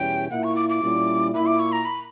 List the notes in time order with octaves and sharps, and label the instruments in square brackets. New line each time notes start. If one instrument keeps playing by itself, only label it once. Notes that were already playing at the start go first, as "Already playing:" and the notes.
Already playing: [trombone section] E2 B2 G3 C#4 E4 [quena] G5
[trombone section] A#2 A#3 E4 [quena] F#5
[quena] C#6
D6
D6
[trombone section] A#2 G3 C#4 E4
[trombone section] A#2 A#3 E4 [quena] B5
[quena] D6
C#6
A#5
B5